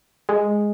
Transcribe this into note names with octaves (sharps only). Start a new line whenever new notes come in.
G#3